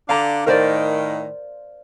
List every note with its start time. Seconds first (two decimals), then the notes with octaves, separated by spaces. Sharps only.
0.09 D3 D4 F5 A#5
0.46 A2 D#3 A#4 C5 D5